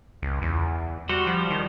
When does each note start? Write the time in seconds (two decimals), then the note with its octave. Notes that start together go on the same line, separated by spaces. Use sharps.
0.22 C#2
0.42 E2
1.09 G3 F#4 C5
1.27 F3
1.50 D#3